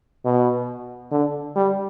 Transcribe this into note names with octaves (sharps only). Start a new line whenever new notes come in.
B2
D3
G3